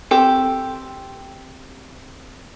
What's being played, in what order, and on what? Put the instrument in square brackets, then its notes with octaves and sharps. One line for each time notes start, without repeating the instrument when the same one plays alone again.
[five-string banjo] C4 G4 A4